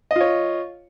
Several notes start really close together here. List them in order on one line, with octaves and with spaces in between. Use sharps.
D#5 F4 C#5